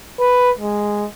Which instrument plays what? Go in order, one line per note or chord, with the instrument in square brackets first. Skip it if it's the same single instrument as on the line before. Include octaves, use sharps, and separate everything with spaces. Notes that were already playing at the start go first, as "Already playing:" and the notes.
[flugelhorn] B4
G#3